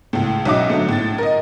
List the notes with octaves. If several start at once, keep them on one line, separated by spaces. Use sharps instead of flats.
C#2 A2
B1 C#4 F#4 D#5 E5 D6
D3 F#3 A3
A2 A6
A#4 D#5